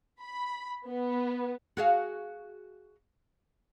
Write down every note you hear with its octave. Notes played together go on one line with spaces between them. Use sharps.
B5
B3
F#4 G#4 F5